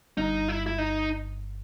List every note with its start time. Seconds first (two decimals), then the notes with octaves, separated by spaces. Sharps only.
0.17 G1 G2 D#4
0.48 E4
0.66 E4
0.78 D#4